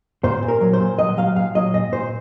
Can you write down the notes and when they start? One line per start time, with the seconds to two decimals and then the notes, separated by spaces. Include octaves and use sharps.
0.24 A#2 C5
0.43 A#2
0.48 A#4
0.61 F#3
0.73 C5
0.80 A#2
0.99 F#3 D#5
1.17 F#3 F5
1.36 A#2 F5
1.55 F#3 D#5
1.74 A#2 D#5
1.92 A#2 C5